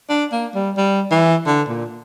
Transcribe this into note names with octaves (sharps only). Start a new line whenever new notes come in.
D4
A#3
G3
G3
E3
D3
A#2